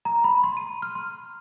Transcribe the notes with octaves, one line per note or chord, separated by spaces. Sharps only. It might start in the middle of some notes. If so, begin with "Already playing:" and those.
A#5
B5
C6
D#7
F6
C6